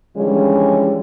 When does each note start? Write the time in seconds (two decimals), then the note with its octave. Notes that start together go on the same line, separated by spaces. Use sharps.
0.17 D3 E3 F3 G3 G#3 C#4